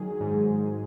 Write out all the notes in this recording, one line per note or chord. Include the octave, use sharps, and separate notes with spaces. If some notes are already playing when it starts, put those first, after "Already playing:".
Already playing: D#3 F#3 G#4
G#2